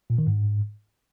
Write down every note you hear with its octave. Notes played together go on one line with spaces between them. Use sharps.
A#2
D#3
G#2